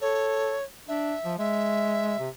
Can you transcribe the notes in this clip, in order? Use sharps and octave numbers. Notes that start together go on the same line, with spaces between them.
A4 C#5
D4 E5
F3
G#3 E5
C3